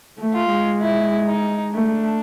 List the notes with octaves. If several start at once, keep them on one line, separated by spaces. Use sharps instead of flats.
A3
F4
G#3
E4
D#4
A3 D4